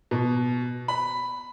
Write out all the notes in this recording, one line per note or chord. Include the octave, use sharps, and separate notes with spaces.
B2
B5